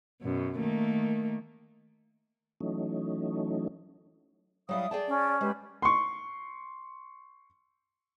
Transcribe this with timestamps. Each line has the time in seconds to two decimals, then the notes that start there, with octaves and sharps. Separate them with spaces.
0.22 F#2 B2
0.58 D#3 A3 A#3
2.60 E3 F#3 A3 C#4 D#4
4.69 F#3 G3 E4 F5 D#6
4.91 G#4 D5 G5 A5
5.08 C#4
5.41 G#3 G4 B4
5.82 C6 C#6